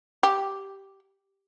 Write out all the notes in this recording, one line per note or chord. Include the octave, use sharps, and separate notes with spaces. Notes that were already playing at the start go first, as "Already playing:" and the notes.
G4